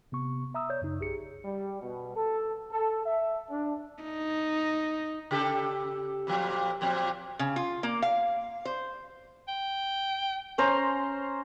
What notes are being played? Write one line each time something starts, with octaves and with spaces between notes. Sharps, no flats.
C3 B3 C#6
E5 A#5 D#6 E6
C#5 D5 G6
F#2 C#3 D#4
A#1 G4 G#4 C#7
G3
B2
A4
A4
E5
D4
D#4
C#3 G4 A4
F2 A#2 F3
A#2 F3 C4
C#3
F4
A#3
F5
C5
G5
C#4 C5 A#5